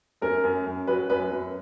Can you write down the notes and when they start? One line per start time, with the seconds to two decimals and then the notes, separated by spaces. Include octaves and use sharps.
0.22 F#2 A#4
0.44 F#2
0.66 F#2
0.87 F#3 B4
1.10 F#2 B4
1.31 F#2